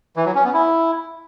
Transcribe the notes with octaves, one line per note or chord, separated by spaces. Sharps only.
E3
F#3
C#4
B3
E4